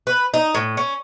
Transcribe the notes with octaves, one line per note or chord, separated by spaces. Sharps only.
B4
D#4
A2
C#4